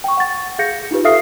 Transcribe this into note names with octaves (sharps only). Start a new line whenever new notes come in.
G5 C#6
F#5 A6
G#4 F5 G6 A#6 C#7
D#4 F4 G4 B4
A4 E5 F5 D#6 F6 C7